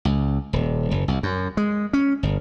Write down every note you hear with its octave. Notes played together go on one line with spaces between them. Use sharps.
C#2
D#1
F#1
C2
F#2
G#3
C#4
G1